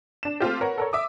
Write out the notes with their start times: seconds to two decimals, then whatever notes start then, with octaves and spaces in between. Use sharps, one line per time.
0.23 D4 E7
0.40 A3 C4 F4 G4
0.61 A#4 B4 C#5 F#5
0.78 A4 A#4 C#5
0.93 E5 D6 D#6